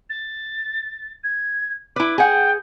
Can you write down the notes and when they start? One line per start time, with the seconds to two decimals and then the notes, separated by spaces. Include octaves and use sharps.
0.10 A6
1.24 G#6
1.96 E4 B4 D6
2.18 G#4 F#5 G5